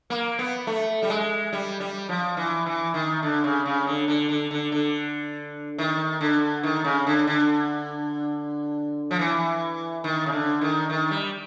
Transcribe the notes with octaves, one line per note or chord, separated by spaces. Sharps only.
A#3
B3
A3
G3
G#3
G3
G3
F3
E3
E3
D#3
D3
C#3
C#3
D3
D3
D3
D3
D3
D#3
D3
D#3
C#3
D3
D3
F3
E3
D#3
C#3
D3
D#3
D#3
G3